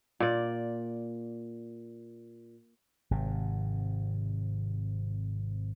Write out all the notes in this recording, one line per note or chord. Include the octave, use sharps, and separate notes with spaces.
A#2 D5
G#1 C3